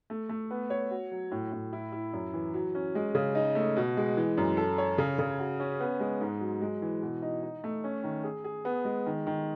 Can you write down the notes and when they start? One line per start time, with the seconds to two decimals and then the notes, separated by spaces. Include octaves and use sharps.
0.10 A3
0.29 A3
0.51 B3
0.70 C#5
0.91 F#4
1.12 F#3
1.31 A2
1.52 A2
1.73 E4
1.92 E4
2.13 F#2
2.34 E3
2.54 F#3
2.75 C#4
2.95 G#3
3.15 C#3
3.35 D#4
3.55 A3
3.76 B2
3.97 G#3
4.17 E3
4.37 F#2
4.57 A4
4.78 C#5
4.98 C#3
5.19 C#3
5.39 F#4
5.60 C#4
5.80 B3
6.00 G#3
6.21 G#2
6.41 F#3
6.62 G#3
6.82 E3
7.02 B2
7.22 D#4
7.43 D#4
7.64 A3
7.84 C#4
8.04 D#3
8.24 G#4
8.44 G#4
8.65 B3
8.85 G#3
9.06 D#3
9.27 D#3